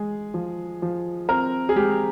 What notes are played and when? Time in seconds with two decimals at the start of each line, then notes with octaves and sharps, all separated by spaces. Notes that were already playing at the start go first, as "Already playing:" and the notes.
Already playing: G#3 G#4
0.34 F3
0.82 F3
1.29 C4 A#4
1.69 G#4
1.76 G#3 G4